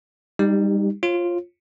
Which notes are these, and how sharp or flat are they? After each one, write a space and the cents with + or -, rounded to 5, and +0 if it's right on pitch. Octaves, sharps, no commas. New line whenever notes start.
G3 +30 D#4 -5 G4 +0
F4 +0 C#5 -45